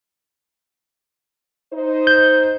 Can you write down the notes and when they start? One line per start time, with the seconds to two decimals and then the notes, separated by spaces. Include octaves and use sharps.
1.73 D#4 C5
2.07 G6